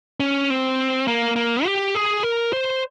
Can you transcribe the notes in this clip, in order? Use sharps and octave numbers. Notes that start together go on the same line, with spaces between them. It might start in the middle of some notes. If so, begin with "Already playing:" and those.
C#4
C4
A#3
A#3
G4
G#4
A#4
C5